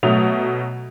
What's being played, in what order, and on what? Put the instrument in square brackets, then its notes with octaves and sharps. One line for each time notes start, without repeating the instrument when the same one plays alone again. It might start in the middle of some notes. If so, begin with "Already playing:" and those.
[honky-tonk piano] B2 F#3 A3 D#6 F7